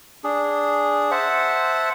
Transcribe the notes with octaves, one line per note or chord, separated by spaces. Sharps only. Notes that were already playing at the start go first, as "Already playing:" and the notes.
D4 G#4
C5 E5 F#5 A5